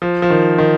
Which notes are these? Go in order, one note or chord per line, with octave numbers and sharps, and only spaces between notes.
F3
F3
D#3
D#3